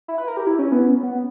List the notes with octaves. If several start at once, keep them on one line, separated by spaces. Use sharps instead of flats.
E4
B4
A#4
G4
E4
C#4
B3
B3